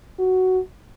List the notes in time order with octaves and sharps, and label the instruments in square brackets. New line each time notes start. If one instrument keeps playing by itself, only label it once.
[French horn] F#4